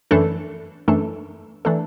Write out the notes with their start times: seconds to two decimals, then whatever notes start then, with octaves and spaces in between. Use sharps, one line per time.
0.11 F#2 E3 A3 D4 A4
0.88 F#2 E3 A3 D4 A4
1.65 E3 A3 D4 A4